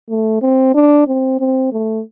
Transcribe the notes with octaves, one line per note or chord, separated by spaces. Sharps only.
A3
C4
D4
C4
C4
A3